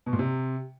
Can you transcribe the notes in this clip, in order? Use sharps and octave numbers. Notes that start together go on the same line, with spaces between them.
B2
A#2
C3